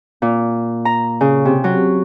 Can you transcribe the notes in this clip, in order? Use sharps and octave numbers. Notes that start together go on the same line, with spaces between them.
A#2
A#5
C#3
C3
F#3